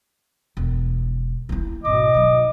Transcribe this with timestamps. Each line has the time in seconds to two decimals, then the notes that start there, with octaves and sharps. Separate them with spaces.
0.57 E1
1.49 A#3 E4
1.85 G#1 B2 D#5 D6
2.14 F#3 D#4